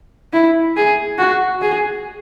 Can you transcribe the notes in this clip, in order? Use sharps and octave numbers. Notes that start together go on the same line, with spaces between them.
E4
G#4
F#4
G#4